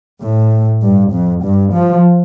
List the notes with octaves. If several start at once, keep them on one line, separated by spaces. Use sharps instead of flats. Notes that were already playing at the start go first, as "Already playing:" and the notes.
A2
G2
F2
G2
F3